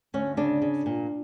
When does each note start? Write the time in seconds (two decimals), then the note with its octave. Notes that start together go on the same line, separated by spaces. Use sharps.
0.14 D2 C#4
0.37 C#3 D4
0.62 C#3
0.86 A#2